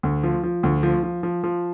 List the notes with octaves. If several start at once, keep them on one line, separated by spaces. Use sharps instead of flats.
D2
F3
F3
D2
F3
F3
F3
F3